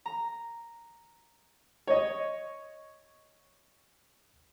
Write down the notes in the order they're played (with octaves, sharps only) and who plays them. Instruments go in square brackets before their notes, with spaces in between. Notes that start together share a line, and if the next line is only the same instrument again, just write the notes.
[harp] A#5
[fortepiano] C#5 D#5